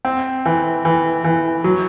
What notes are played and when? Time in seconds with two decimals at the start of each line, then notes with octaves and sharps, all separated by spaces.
0.05 C4
0.45 E3
0.85 E3
1.24 E3
1.64 F#3